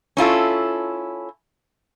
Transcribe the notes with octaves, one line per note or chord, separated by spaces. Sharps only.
C#4 E4 F4 A4